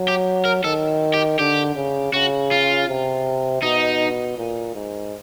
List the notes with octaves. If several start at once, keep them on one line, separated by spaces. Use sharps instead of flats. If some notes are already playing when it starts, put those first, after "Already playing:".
Already playing: F#3
G4
A#4
D#3 A4
G4
D3 G4
C#3
C#3 F#4
F4
C3
B2 D#4
A#2
G#2